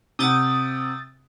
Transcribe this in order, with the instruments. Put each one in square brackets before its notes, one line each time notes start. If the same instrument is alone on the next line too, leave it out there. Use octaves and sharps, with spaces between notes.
[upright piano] C3 F#5 [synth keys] D#6 G6 A6